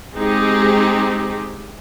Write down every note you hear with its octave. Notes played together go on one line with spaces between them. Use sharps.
G#3 C4 D#4 G4 G#4